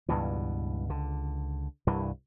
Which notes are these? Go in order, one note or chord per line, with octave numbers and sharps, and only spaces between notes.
C#2 G2 B2 E3
C#2 D3
C2 G2 E3